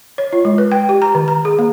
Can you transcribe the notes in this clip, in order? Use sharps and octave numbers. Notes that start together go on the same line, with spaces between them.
C#5
F4
G#3
B4
G5
G4
A#5
D#3
A#5
G#4
A#3